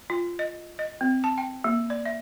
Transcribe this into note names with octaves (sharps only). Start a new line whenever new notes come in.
F4
D#5
D#5
C4
A5
G5
A#3
D5
E5